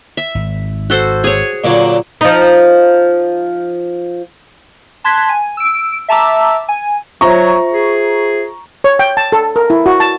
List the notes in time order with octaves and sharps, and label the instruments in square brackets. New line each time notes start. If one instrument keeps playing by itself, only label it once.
[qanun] E5
[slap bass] G#1
[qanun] F#4 A4 C5
[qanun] G#4 C#5 [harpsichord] G#5
[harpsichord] A#2 D3 F#3
[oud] F3 D#4
[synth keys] A5 C6 F#6 G#6 B6
G#5
E6 D7
E5 A5 A#5 D6 E6
G#5
[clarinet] F#3 [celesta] F4 C5 E5 [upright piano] A#5 C#6
[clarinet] G#4
[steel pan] C#5
G5
A5
A4
A#4
E4
F#4
A5